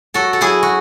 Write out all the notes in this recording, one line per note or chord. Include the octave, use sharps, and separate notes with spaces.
F#3 F#4 A4
A4
F#3 E4 G#4
F#4